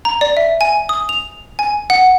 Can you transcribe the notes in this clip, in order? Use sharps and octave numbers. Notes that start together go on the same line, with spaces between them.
A#5
D5
E5
G#5
D#6
F7
G#5
F#5